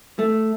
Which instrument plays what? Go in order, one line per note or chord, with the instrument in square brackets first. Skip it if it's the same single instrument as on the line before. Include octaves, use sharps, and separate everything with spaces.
[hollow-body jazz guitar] A3